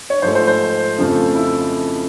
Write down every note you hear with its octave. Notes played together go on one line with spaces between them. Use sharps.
C#5
G#2 F3 A3 C5
C5
C5
F2 C#3 F3 A3
E4